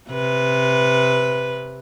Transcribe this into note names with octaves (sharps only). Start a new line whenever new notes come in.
C3 B4